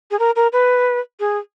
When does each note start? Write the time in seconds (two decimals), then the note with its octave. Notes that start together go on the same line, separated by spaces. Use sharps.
0.11 G#4
0.19 A#4
0.36 A#4
0.53 B4
1.20 G#4